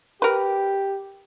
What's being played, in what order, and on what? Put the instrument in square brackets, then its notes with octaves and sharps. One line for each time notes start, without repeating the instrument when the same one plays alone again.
[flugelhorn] G4 [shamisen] A#4 B4